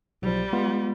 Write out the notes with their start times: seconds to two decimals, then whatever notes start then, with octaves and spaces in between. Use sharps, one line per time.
0.22 B1 F3 G3
0.53 G#3 B3 F4